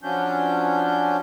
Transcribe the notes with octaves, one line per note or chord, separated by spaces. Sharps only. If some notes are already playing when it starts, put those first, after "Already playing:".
F3 F#3 C#4 D4 G6